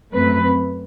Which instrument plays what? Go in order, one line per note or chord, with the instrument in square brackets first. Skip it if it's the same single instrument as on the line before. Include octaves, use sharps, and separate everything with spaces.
[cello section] F#2 F#3 A3 C4 B4